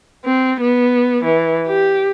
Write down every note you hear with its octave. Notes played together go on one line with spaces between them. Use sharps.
C4
B3
E3
G4